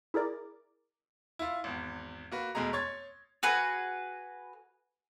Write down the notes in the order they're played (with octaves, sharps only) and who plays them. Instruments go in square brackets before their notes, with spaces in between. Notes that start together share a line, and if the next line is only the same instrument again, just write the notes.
[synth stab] E4 G#4 A#4 D5
[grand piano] E4 F4
G#1 E2
A#3 F#4 B4
F1 E2 B2 G#3 G#4 A#5
C#5 C6 C#6 G#6 A6
[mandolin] F#4 G#4 B4